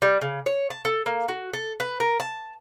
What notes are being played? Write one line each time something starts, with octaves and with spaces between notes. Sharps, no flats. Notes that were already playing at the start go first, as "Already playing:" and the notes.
G3
C#3
C#5
A5
A4
A#3
F#4
A4
B4
A#4
A5